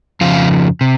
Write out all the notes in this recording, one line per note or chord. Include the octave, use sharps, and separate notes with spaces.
F2 C#3 F3 F4
C3